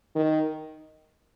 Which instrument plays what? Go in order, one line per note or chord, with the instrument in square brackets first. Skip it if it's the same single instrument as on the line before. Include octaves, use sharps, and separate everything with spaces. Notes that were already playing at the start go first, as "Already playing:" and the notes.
[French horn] D#3